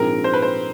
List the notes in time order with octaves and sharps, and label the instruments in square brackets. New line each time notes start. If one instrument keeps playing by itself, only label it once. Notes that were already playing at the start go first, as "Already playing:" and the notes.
Already playing: [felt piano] A#1 G#2 F3 G#3 C4 [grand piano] A#4
[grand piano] C5
B4
C5